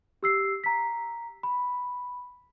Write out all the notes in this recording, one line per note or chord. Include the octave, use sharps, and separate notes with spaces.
G4 E6 C7
A#5 B6
B5